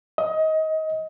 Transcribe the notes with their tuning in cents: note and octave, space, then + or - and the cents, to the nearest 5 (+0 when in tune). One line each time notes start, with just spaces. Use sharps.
D#5 +25